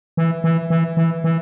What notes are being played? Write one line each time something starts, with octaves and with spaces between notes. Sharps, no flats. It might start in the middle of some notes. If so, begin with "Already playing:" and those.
E3
E3
E3
E3
E3